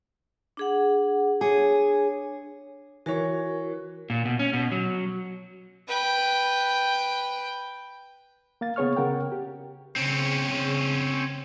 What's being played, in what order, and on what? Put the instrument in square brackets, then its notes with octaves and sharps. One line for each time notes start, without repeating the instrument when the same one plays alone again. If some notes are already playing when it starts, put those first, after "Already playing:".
[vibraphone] D4 G#4 F#5
[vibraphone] D4 C#5 [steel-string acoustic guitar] G#4
[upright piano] E3 C#5 [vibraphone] F#4 A#4
[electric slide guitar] A#2
B2
C#4
B2
F#3
[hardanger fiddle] B4 G5
[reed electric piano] A#3 F5 A6
C#3 B3 G#4 C#5 C#6 F6
C#3 A#4 F#5 G5
G4
[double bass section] C#3 [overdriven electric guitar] C4 C#4